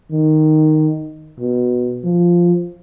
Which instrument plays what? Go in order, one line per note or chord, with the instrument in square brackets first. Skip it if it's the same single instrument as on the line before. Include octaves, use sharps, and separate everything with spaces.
[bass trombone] D#3
B2
F3